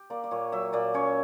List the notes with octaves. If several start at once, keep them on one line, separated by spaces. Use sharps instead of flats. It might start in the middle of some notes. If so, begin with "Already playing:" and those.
Already playing: G4
A#3 D5
D5
A#2 C#5
F#3 E5
A#2 D5
C#4 C#5